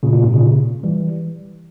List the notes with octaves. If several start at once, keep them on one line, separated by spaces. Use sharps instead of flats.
A#2 C#3
A#2
G#2 C3
A#2 C#3
E3 G3